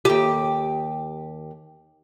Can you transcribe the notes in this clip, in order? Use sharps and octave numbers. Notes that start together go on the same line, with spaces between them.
D#2 G4